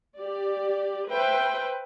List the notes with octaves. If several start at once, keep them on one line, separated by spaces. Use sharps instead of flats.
G4 D5
B4 C5 E5 G5